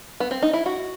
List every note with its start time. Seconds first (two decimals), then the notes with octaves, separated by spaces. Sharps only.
0.20 B3
0.31 C4
0.43 D#4
0.53 E4
0.66 F#4